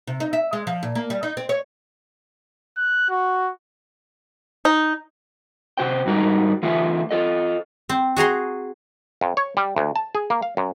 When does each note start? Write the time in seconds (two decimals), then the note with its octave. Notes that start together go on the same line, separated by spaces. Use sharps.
0.07 C3
0.20 D#4
0.33 E5
0.53 G#3
0.67 F3
0.83 A#2
0.95 A#3
1.10 G3
1.23 D#4
1.37 C4
1.49 C#5
2.77 F#6
3.10 F#4
4.65 D#4
5.77 C3 F#4 C5 G5
6.06 G#2 G3 D#4 F#4 A#4
6.63 E3 A3 F4 E5
7.11 F4 A4 D#5
7.89 C4
8.16 F#4 G#4 A#5 C6
9.21 F2
9.37 C#5
9.57 G3
9.76 D2
9.96 A5
10.15 G#4
10.30 A#3
10.42 F5
10.57 F#2